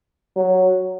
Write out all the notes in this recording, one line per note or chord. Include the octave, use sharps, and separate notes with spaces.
F#3